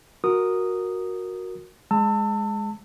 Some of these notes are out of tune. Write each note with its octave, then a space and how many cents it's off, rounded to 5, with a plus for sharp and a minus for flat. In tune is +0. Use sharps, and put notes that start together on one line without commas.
F#4 -10 A#4 +0 D#6 -10
G#3 +0 A5 +30 E6 -5